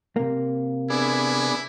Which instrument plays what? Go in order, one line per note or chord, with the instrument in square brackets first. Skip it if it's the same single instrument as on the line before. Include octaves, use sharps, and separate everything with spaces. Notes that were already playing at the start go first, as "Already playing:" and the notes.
[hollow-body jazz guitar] C3 A#3
[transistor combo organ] B3 D4 G#4 [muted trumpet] E4